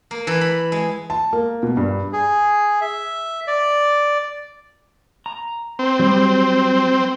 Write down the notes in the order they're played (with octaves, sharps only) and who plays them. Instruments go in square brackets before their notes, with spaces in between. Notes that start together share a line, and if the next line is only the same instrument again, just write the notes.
[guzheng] A#3
E3
B5
G#3
[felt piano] A5
A#3
B2
G2
[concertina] G#4
E5
D5
[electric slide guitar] A#5
[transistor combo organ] C4
[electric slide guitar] F#3 G3